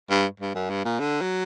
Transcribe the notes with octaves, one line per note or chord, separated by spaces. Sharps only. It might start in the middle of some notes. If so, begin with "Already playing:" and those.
G2
G2
F#2
G2
A#2
D3
F#3